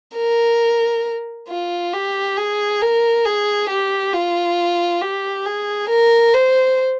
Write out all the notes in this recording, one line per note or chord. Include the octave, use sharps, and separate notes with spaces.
A#4
F4
G4
G#4
A#4
G#4
G4
F4
G4
G#4
A#4
C5